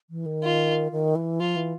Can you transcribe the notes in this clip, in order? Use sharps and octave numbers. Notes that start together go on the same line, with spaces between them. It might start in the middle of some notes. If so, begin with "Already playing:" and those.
E3
D#3
F4
D#3
E3
F3 F4
E3